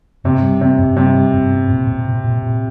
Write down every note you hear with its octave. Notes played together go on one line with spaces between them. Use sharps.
G2 C3
G3
C3 C#4
G2
C3 G3
G3
G2
C#4
A#2
A#2
A#2
A#2
A#2